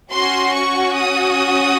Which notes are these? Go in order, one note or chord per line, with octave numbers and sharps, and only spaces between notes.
C#4 F#4 C6
C#6
D#6